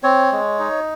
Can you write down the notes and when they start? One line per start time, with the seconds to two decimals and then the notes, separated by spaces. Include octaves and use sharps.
0.03 C4 C#5
0.32 G#3
0.59 D#4